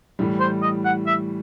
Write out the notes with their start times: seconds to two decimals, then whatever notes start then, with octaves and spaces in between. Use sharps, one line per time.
0.19 A2 E3 G3
0.40 C5
0.62 D#5
0.85 F#5
1.07 E5